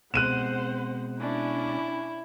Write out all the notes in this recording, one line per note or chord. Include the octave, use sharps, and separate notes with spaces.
B2 G#3 C4 C5 F#5 F#6 D#7 E7
C#4 D4 E4